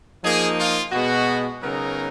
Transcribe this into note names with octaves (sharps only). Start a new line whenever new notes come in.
F3 A#3 D#4 G#4
F4
B2 G#3 B3 F#4
C#3 F#3 B3 D#4 A#4